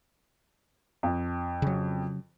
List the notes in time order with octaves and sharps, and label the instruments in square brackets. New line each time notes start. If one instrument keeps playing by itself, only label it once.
[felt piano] F2
[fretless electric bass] C#3 F#3